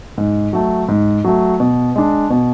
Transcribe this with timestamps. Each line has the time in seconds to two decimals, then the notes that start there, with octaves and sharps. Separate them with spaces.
0.18 G#2
0.53 F#3 A3
0.88 G#2
1.25 F#3 A3
1.60 B2
1.96 G#3 D4
2.30 B2